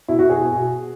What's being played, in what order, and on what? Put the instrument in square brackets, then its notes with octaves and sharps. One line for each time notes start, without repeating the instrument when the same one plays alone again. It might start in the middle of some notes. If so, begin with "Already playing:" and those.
[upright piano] B2 E4
F#4
B2
G#4
B2